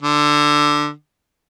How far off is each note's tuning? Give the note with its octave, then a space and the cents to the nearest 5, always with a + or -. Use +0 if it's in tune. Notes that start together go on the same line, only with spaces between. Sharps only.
D3 +10